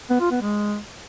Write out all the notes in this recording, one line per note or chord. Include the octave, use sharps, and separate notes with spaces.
B3
F4
B3
G#3